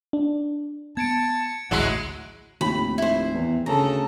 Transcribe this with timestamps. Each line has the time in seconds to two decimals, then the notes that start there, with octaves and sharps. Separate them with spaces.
0.13 D4
0.97 B3 A5 G#6 C#7 D7
1.71 A1 D2 F#3 G#3 E4 F#5
2.61 F1 D#2 A2 B5
2.98 E4 C5
3.34 E2
3.66 D2 C#3 A4 A#5